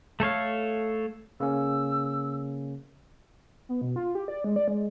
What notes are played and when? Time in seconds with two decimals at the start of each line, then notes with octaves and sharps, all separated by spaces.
0.20 A3 A4 C#5 F5
1.40 C#3 A#3 C#4 E6
3.69 B3
3.82 B2
3.96 F4
4.15 G4
4.28 D5
4.44 G#3
4.56 D5
4.68 G#3